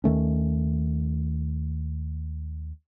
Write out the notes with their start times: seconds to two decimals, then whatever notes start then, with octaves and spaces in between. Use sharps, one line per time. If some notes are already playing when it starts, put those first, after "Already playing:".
0.04 D#2 D#3 A3 C#4